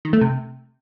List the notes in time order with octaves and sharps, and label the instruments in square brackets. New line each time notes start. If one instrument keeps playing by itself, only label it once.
[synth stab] D#3
A3
C3